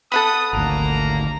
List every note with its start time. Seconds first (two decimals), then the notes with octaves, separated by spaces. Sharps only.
0.12 A4 F#5 B5 D#6
0.53 G#1 D2 A#3 A#5